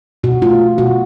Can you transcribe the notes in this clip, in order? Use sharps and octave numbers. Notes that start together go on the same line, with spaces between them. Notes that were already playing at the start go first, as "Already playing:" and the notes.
B2 F#4
A3 F4
B2
B2 F#4